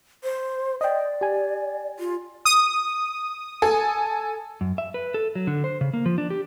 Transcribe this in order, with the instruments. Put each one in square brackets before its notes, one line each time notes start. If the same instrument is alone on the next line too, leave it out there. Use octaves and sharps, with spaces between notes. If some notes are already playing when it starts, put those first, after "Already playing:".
[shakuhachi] C5
[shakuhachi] D5 [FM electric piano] D#5 G5
[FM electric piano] G4 G#5
[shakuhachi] F4
[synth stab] D#6
[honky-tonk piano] A4 G#5
[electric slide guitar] F#2
E5
B4
A4
F#3
D3
C5
C#3
A#3
F3
D4
G4